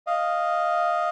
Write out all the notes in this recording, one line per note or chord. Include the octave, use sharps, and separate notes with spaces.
D#5 F5